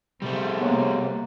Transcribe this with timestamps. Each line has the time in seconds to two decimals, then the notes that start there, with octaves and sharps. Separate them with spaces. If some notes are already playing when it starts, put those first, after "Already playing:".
0.22 C3 G3 A3
0.61 A#3 B3 C#5 F#5